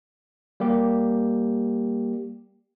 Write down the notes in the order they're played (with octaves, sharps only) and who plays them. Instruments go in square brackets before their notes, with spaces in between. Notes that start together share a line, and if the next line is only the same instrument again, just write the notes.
[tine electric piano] G3 A#3 G4